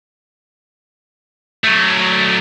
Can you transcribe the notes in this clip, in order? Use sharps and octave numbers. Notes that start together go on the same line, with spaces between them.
F#3 A3